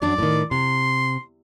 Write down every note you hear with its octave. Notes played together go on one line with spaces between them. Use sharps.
F#2 F#3 D4 D5
A2 D#3
C3 C6